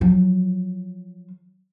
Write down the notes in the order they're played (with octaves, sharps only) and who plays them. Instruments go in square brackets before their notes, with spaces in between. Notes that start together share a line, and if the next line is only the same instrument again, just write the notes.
[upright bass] F3 F#3